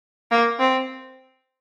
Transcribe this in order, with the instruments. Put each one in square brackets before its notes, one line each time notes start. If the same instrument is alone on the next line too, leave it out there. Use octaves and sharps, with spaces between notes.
[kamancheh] A#3
C4